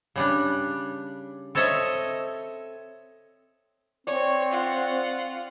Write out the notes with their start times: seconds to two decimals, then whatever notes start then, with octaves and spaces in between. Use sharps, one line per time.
0.16 C#3 G3 D4
1.55 C4 A4 C#5 D#5 E5
4.07 C4 C#5 D5 G#5 C#6
4.52 F4 F#5